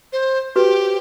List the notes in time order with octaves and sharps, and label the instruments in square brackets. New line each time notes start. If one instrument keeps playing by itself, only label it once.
[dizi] C5
[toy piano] F#4 B4 [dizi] G4